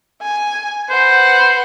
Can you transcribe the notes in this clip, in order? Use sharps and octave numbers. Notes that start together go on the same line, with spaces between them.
G#5
B4 C5 F#5